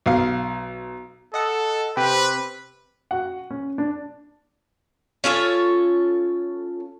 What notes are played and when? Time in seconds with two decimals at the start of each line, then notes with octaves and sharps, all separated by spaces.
0.06 B1 F5
1.34 A4 D#5 F#5
1.97 C3 C4 G4 B4
3.11 F#4 F#5
3.51 C#4
3.78 D4
5.24 C#4 F4 A4 C#5